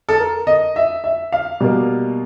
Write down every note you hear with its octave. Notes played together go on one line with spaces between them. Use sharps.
A4
A#4
D#5
E5
E5
F5
B2 G3 A#3